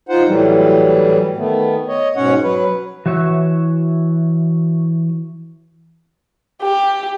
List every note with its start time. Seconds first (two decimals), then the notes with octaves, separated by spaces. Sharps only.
0.09 D#4 F4 C5 F#5
0.26 A2 E3 F#3 G3
1.37 D#3 A3 B3
1.88 C#5 D#5
2.16 G#2 B2 C#4 C#5 F#5
2.43 F#3 B4
3.06 E3 F#4 C#5 E5
6.62 G4